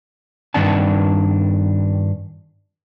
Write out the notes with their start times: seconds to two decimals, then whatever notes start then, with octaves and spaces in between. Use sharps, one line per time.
0.54 G2 D#3 C4 D4 F#5 A5